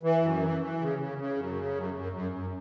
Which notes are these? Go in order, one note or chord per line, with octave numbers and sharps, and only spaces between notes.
E3
F#2
E3
E3
C#3
C#3
C#3
F#2
C#3
F#2
F#2
F#2
F#2